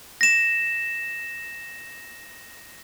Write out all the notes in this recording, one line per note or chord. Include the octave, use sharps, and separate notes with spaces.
A#6 E7